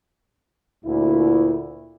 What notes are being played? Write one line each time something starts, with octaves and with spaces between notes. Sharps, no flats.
D2 A#2 E4